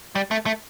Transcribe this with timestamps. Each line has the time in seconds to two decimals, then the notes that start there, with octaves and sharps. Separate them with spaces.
0.15 G3
0.31 A3
0.46 A3